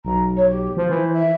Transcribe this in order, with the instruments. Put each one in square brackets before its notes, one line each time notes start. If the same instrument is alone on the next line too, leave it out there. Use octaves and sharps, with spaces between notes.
[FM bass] B1 [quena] A#5
[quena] C#5
G4
[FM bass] F3 [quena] C5
[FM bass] E3
[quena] E5